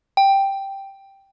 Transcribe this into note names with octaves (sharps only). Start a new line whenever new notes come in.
G5